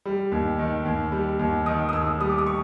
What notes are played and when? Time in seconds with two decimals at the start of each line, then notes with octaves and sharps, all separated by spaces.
0.05 G3
0.32 D#2
0.59 D#3
0.85 D#2
1.12 G3
1.39 D#2
1.66 D#3 D#6
1.89 D#6
1.93 D#2 E6
2.20 G3 D#6
2.30 D6
2.38 D#6
2.46 C#6